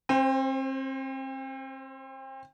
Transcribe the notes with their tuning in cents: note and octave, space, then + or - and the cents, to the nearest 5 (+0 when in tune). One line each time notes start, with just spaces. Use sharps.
C4 +35 C5 +0